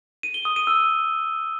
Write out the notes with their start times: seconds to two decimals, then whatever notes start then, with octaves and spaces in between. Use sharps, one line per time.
0.23 D#7
0.34 G7
0.45 D#6
0.56 D#7
0.67 E6